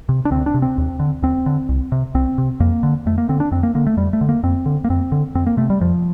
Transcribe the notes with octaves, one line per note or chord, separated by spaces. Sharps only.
C3
D4
D2 C4
D4
C3
C4
D#2
D3
D#2 C4
D3
C2
C3
C2 C4
C3
F2 A#3
D3
F2 A3
A#3
D3 C4
D4
F2 C4
A#3
D3 A#3
A3
F2 G3
A3
D3
A#3
F2 C4
D3
A#3
F2 C4
D3
F2 C4
A#3
C3 A3
G3
F2 F3